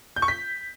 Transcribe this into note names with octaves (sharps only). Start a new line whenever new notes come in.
G6
C#6
B6